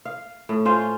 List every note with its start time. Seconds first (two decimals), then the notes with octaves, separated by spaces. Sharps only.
0.05 F5
0.49 A2
0.65 C#4 F4 C5